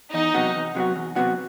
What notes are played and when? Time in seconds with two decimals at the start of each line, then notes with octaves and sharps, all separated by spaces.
0.13 E2 D#4
0.34 C3 F#3 B3 F#4
0.54 E2
0.75 C3 F#3 B3 F#4
0.96 E2
1.16 C3 F#3 B3 F#4